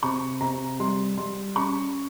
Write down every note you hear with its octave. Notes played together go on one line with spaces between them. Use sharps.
C3 C#6
C3 A#5
G3 C6
G3 C6
C#4 C#6